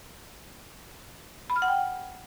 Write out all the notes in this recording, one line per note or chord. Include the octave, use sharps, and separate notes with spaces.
B5
F6
F#5
G5